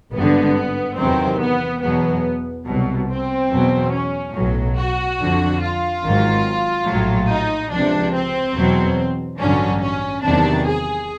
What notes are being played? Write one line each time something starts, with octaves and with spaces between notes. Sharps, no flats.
G#1 G2 D3 B3
E2 C3 D#3 F#3 C4
B3
E2 B2 F#3 B3
C2 B2 F#3
C4
E2 B2 F#3
C#4
B1 A2 F#3
F#4
F2 D3 F3
F4
G#1 G#2 D#3 F#3
A#1 A2 F#3
D#4
C#2 C3 F3 D4
C4
E2 B2 F#3
A1 G2 D3 F#3 C#4
C#4
E2 C3 D#3 F#3 D4
G#4